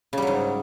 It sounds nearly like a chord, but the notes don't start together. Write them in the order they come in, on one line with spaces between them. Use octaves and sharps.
C#3 G3 F#3 G#2